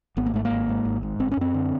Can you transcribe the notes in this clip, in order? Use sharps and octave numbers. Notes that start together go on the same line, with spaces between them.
G#1 B3
A#3
G#2 A3
A#3
G#1
G#2
G#1
G#2
G1 C4
C#4
F#2 C4
D3